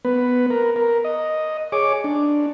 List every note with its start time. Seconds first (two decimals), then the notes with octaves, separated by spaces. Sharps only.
0.05 B3 B4
0.50 A#4
0.76 A#4
1.05 D#5
1.72 G#4 C#5 D6
2.04 D4